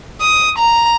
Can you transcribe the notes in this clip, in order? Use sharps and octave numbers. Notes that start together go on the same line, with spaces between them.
D#6
A#5